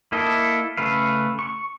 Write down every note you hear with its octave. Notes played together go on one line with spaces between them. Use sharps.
A#3 E4 A4 D#5
C#3 A3 B4 F5
C#6